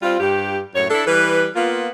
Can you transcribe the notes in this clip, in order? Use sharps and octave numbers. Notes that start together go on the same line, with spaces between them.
G3 C4 F4
G2 G4
F#2 A2 C#5
D4 E4 A4
E3 G3 B4
A#3 B3 F4